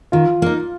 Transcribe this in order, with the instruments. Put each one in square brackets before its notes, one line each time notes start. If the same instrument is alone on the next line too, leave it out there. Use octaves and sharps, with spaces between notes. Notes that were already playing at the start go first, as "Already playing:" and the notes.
[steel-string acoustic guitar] D#3 [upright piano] F4
[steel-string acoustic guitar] A#3 D#4